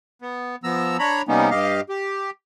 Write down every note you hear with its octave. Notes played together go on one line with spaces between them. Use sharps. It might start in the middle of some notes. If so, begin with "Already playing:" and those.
B3
F3 B3 A#5 E6
D4 C#5 A#5 B5
C3 G3 A#3 B3 C#4 D#4
G2 G4 D#5 F5
G4